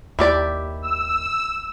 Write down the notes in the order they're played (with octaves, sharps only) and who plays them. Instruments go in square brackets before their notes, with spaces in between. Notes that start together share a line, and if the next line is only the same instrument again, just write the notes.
[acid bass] D#2 [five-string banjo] E4 G4 D5
[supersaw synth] E6